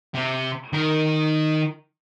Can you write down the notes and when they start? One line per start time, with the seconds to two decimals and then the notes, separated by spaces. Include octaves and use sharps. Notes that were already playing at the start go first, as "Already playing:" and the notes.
0.14 C3
0.73 D#3 A#4